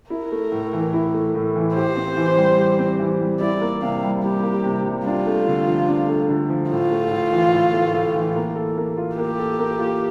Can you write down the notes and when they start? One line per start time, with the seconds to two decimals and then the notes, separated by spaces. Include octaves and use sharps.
0.10 E4 A#4
0.32 A3
0.52 A2
0.73 E3
0.93 E4
1.14 A3
1.35 A2
1.56 E3
1.75 G4 C5
1.96 C4
2.17 E3
2.37 G3
2.59 G4
2.79 C4
2.99 E3
3.20 G3
3.40 E4 D5
3.61 A#3
3.82 C3 F5
4.03 G3
4.23 E4 G4
4.43 A#3
4.64 C3
4.85 G3
5.05 D4 F4
5.27 A3
5.47 D3
5.67 F3
5.88 D4
6.09 A3
6.29 D3
6.50 F3
6.70 A2 F4
6.92 A3
7.11 A2
7.32 E3
7.53 A2
7.73 A3
7.94 A2
8.15 E3
8.36 A#3
8.56 A4
8.77 A#3
8.97 F4
9.18 A#3 G4
9.39 A4
9.59 A#3
9.79 F4